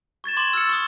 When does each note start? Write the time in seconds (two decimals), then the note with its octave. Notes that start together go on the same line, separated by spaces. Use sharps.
0.24 C#6 G#6 A6 E7
0.37 C6 D6 G#6 E7 F#7
0.53 E6 F6 A6 C#7
0.69 C#6 D#6